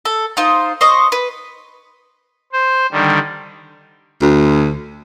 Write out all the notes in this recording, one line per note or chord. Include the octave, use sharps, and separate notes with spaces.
A4
D#4 F4 C5
C5 D#5 C#6
B4
C5
D3 D#3 G3
D2